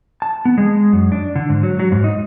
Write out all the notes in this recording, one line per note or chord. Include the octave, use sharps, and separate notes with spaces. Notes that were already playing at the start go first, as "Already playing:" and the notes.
A5
B3
G#3
F#2
D4
D3
G#2
F#3
F#3
G#2
D#4